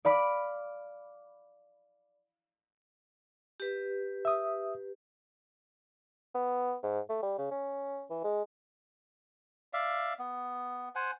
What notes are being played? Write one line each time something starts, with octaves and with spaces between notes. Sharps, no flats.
D5 F5 B5 D6
G4 B4
E5 D#6
B3
G#2
A3
G3
C#3
C#4
E3
G#3
D5 E5 F5
B3
C5 F#5 G#5